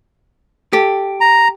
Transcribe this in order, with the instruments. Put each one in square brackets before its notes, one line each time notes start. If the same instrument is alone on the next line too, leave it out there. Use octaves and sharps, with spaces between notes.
[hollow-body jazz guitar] G4 A4
[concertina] A#5